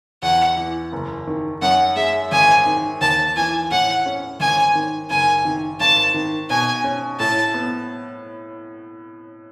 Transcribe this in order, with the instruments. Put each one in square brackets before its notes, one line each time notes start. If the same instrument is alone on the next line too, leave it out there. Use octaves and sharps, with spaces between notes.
[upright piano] E2 [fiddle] F#5
[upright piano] E3
F#1
D#3
[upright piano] F#2 [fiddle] F#5
[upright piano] G#3 [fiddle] E5
[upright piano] G#1 [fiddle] G#5
[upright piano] D#3
[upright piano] D#2 [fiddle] A5
[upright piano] E3 [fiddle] G#5
[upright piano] A2 [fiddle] F#5
[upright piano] C#4
[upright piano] G#1 [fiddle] G#5
[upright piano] D#3
[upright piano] F#1 [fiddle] G#5
[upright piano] D#3
[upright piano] G#1 [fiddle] A5
[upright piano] D#3
[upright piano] B2 [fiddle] G#5
[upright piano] C#4
[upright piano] A2 [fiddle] A5
[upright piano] B3